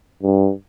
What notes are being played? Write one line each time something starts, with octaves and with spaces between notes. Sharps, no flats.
G2